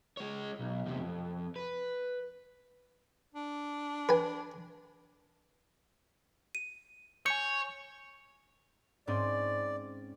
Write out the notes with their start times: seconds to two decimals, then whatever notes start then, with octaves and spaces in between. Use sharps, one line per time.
0.17 G#3 C#5
0.59 B1
0.86 E2 C3
0.99 F2
1.56 B4
3.35 D4
4.09 B4 G#5
6.55 D#7
7.26 C#5 G#5 C#6 G6 C#7
9.07 G#2 C4 C#4 D5